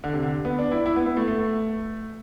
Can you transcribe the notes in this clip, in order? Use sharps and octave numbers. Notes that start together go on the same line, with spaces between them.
D3
C3
D3
B3
D4
E4
E4
B3
B3
A3
A3